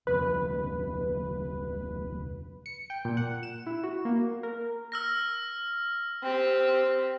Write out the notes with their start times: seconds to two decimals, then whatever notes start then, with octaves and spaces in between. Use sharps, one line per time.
0.07 D1 F2 C#3 B4
2.66 C#7
2.90 G5
3.05 A#2
3.17 F#5
3.43 E7
3.67 E4
3.84 F#4
4.05 A#3
4.43 A#4
4.92 E6 F6 A#6
6.23 C4 G4